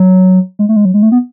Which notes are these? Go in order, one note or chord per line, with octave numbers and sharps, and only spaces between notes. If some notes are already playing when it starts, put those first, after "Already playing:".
Already playing: F#3
G#3
A3
G#3
F#3
G#3
A3
B3